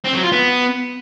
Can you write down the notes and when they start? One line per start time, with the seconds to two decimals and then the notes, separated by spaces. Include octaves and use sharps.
0.05 C4
0.14 F#3
0.23 F4
0.32 B3